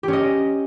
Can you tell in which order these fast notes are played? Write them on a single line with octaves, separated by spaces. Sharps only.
G4 C#4 D#5